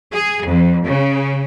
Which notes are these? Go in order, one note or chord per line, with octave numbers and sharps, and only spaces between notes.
G#4
F2
C#3